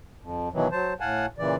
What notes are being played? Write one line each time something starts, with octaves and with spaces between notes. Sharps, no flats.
F2
B2 D#3 E3 F#3
F#3 C5 A5
A2 F5 F#5 G#5 A5
A#2 C#3 E3 D5